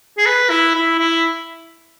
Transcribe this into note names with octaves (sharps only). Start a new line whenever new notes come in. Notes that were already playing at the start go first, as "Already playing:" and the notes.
G#4
B4
E4
E4
E4